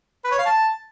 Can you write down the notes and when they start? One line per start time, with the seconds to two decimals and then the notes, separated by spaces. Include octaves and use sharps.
0.24 B4
0.31 C#5
0.39 F5
0.46 A5